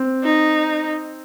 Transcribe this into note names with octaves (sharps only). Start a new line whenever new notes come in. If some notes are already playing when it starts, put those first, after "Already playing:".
Already playing: C4
D#4